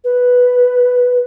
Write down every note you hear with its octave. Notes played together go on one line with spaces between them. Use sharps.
B4